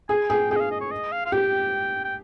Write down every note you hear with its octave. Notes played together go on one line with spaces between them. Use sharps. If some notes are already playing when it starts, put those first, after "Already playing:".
G#4 G#5
G#4 G5
G#4 G5
D#5
F5
D#5
C#5
D#5
F5
F5
G4 G5
G5